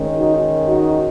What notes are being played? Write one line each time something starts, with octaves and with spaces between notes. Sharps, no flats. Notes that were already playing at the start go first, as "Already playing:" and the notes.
Already playing: D#3 G#3 C#4
D#4 F#4
D#4 F#4